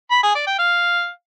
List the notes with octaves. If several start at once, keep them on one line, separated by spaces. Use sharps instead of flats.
B5
G#4
D5
G5
F5